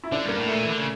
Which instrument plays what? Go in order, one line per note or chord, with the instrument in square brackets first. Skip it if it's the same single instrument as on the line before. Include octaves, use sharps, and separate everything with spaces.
[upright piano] E4
[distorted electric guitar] D3 [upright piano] D4
[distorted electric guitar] G2 [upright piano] A#3
[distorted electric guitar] A2
[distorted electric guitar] A#2 [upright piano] A3
[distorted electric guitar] E3
D3
C#3